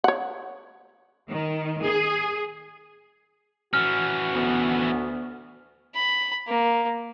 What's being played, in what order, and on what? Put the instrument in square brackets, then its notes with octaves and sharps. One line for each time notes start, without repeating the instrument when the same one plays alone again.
[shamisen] C#5 F#5
[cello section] D#3
G#4
[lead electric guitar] E3 C#4 [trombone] F#4 [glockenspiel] F6
[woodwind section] D2 B3
[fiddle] B5
A#3